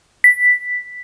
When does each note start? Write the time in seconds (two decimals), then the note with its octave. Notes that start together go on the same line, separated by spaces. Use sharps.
0.24 B6